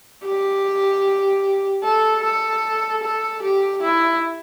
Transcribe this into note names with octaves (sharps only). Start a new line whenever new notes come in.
G4
A4
A4
A4
G4
E4